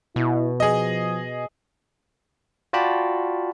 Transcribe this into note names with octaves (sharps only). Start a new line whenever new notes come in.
B2 E4
F3 G#4 D#5
F4 F#4 D5 G5 A5 B5